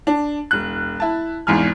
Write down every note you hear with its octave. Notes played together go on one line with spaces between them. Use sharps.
D4
E1 F#6
E4 A5
G#1 E2 G#2 G#5 F6